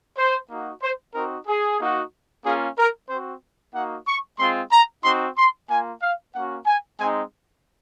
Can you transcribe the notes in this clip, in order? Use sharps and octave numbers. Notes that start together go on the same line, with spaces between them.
C5
A#3 D#4 F#4
C5
C4 D#4 F#4 A#4
G#4
A#3 D#4 F#4
A#3 C#4 F4 G#4
A#4
C4 F#4 C5
A#3 D#4 F#4 F#5
C#6
G#3 C4 F4 C6
A#5
C4 D#4 F#4 C6
C6
A#3 F4 G#5
F5
A#3 C#4 F#4 F#5
G#5
G#3 C4 D#4 G#5